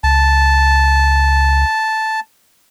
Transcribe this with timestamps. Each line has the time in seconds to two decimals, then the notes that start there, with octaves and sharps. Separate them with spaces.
0.04 C#2 A5